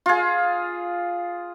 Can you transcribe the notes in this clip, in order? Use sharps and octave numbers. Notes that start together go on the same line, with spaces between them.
F4 G#4